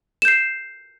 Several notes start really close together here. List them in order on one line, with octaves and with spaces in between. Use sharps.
E7 G6 C7